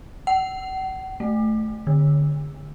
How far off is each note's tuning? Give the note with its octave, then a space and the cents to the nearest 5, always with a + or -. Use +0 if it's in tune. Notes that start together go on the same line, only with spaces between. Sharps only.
F#5 +40
A3 -15
D3 +5